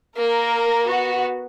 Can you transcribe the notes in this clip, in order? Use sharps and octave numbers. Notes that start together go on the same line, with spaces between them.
A#3 A#4
B3 F#4